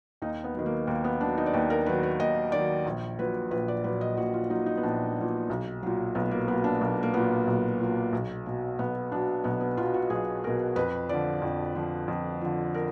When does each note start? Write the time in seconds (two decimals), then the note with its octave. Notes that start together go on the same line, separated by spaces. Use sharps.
0.22 D#2 D#4
0.44 B3
0.54 D#3 F#3
0.66 A#3
0.87 D#2 A#3
1.04 B3
1.20 D#3 F#3 D4
1.38 D#4
1.46 D5
1.54 D#2 B4
1.70 A#4
1.86 D#3 F#3 B4
2.03 B4
2.19 D#2 D#5
2.52 D#3 F#3 D5
2.86 A#1
3.19 A#2 F#3 B4
3.51 A#1 B4
3.68 D5
3.84 A#2 F#3 B4
4.01 D#5
4.17 A#1 F#4
4.34 F4
4.50 A#2 F#3 D#4
4.66 D#4
4.77 B3
4.83 A#1 D4
5.16 A#2 F#3
5.50 B1
5.83 A#2 F#3
6.15 B1 B3
6.31 A#3
6.48 A#2 F#3 B3
6.64 D4
6.81 B1 A#3
7.03 A#3
7.14 A#2 F#3 B3
7.47 B1
7.80 A#2 F#3
8.13 B1
8.46 B2 F#3
8.79 B1 B3
9.12 B2 F#3 D4
9.44 B1 B3
9.61 B3
9.77 B2 F#3 F4
9.94 F#4
10.10 B1 G#4
10.44 B2 F#3 A#4
10.76 F2 B4
11.09 D3 F3 D5
11.42 F2
11.75 D3 F3
12.08 F2
12.41 D3 F3
12.74 A#4